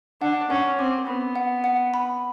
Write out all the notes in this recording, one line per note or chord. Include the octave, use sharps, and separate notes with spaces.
D4 F#5
C#4 F#5
C4 D6
B3 B5
F#5
F#5
B5